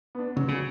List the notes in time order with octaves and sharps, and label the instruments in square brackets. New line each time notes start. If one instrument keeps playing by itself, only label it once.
[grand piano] B3 D4
[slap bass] C#3 [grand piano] F#3
[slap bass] C#3